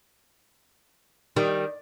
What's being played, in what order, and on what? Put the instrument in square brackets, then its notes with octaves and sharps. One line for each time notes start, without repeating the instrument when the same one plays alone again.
[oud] D#3 [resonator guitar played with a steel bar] G3